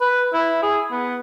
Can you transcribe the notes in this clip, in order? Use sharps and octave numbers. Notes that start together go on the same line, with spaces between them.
B4
E4
G#4
B3